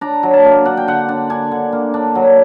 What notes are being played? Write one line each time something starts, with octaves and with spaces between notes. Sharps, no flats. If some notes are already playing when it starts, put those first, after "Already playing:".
D4 A#5
F#3
A5
A#3
D4 F#5
G5
D3 F#5
D4
D4 G#5
D3
A#3
D4
F#3